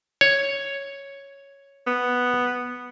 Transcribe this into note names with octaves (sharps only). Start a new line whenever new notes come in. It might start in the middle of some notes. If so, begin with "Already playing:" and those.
C#5
B3